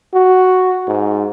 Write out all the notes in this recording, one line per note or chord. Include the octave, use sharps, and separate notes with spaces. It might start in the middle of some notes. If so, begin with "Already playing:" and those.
F#4
G#2